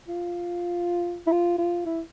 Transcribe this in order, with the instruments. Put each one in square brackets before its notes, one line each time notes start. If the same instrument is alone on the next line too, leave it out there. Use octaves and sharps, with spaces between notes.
[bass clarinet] F4
E4
F4
F4
E4